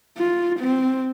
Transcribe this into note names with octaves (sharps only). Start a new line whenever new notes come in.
F4
C4